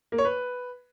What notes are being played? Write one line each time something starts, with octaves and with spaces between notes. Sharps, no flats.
A#3
C#5
B4